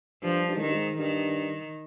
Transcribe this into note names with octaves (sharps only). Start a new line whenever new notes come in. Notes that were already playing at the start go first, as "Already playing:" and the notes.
G2 F3
G2
G#2
G2 D#3
G#2
G2 D#3